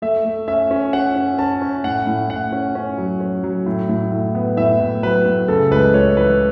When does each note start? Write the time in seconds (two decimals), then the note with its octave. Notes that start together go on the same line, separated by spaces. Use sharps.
0.02 A3 E5
0.25 A3
0.48 C#4 E5
0.71 C#4
0.93 C#4 F#5
1.16 C#4
1.38 C#4 A5
1.62 C#4
1.84 A2 F#5
2.07 A2
2.30 A2 F#5
2.52 C#4
2.75 C#4
2.98 F#3
3.20 C#4
3.44 F#3
3.66 A2
3.89 A2
4.12 A2
4.35 B3
4.57 A2 E5
4.80 A2
5.03 F#3 B4
5.26 A2
5.48 C#3 A4
5.71 C#2 B4
5.94 C#2 C#5
6.17 E3 B4